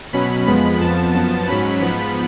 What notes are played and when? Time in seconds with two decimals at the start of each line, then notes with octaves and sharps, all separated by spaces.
0.13 B2 F#3 C#4 B5
0.47 F2 F3 G#3 B3 B5
0.80 F2 F3 B3 A5
1.14 F#2 F3 B3
1.48 G#2 F#3 C#4 B5
1.81 G#2 F3 B3